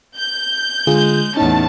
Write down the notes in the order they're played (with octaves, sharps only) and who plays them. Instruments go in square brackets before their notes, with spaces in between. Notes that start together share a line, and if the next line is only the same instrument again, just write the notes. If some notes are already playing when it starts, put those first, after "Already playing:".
[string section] G6
[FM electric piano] D3 F4 G#4 [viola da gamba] G#3
[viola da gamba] E2 A2 C#4 [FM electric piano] D#4 [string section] A5